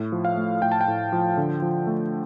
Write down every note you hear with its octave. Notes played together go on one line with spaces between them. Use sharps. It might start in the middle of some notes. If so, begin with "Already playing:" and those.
Already playing: A2
F3
F5
A3
A2 G5
A5
G5
A2
F3
D3
F3
A3